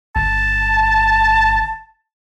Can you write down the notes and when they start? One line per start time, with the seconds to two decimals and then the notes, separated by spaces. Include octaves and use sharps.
0.16 G1 A5